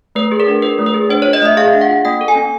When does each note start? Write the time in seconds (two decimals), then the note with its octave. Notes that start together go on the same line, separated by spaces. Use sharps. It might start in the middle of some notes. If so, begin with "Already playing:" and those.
0.15 A3 B4
0.32 G#4
0.40 A#4
0.47 D4
0.62 F4 B4
0.79 A3
0.86 B4
0.94 G#4
1.09 D4 C5
1.22 C#5
1.26 F4
1.33 D#5
1.42 A3 E5
1.57 G#4 F5
1.73 D4
1.81 F#5
1.89 F4
2.05 A#3 G5
2.21 A4
2.28 G#5
2.36 C#4